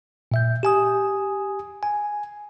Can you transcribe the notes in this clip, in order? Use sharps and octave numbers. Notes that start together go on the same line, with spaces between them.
A#2 E5 G6
G4 G#5 D#6
G#5